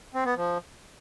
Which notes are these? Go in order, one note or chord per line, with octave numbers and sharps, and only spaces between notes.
C4
B3
F3